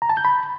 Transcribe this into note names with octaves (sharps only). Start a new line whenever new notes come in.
A#5
A5
G6
B5